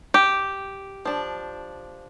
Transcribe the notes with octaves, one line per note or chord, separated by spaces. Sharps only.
G4
F3 D4